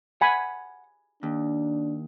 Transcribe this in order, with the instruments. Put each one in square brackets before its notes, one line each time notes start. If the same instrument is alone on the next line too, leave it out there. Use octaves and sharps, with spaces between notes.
[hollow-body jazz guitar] F#5 [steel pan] G#5 B5
[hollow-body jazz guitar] D#2 [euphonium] D4